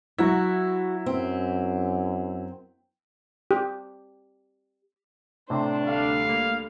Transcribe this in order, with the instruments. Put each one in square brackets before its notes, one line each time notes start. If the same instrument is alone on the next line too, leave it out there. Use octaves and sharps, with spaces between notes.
[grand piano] F#3 E4 [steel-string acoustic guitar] F#4
[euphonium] F#2 [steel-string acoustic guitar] C4
[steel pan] G4
[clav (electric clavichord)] A2 C3 [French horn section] A3 D4 [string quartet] C5
[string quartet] D2 D3 G3 [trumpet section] F5
[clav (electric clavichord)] A#3